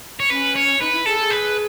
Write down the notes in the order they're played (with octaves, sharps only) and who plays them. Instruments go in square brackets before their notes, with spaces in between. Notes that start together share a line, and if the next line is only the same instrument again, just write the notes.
[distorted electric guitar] C#5
[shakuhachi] C#4 [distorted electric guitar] B4
[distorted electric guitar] C#5
[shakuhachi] D#4 [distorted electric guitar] B4
[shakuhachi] E4
[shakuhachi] G#4 [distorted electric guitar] A4
[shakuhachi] G#4
[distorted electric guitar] B4